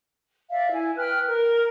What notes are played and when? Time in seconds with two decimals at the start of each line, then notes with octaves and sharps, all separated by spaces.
0.51 D5 E5 F5
0.73 E4 G#5
0.97 B4 G5 F6
1.27 A#4